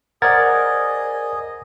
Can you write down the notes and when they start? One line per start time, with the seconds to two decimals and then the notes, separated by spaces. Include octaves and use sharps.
0.22 G#4 A#4 C5 D5 D#5 F#5 G#6 A6